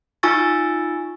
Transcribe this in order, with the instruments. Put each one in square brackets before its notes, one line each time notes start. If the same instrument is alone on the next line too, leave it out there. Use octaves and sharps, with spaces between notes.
[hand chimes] D#4 F4 G#5 C#6 E6 A6